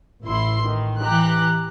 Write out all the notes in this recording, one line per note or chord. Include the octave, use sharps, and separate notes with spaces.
A1 E4 C6
D#3
E3 G4 A#5 F#6